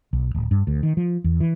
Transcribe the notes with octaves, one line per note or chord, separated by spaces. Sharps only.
B1
D1
G2
D2
D#3
F3
E2
E3